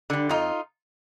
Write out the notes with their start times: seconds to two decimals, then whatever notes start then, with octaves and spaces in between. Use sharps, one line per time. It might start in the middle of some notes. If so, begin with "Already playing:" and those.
0.10 D3 G3
0.29 F2 D#4 F4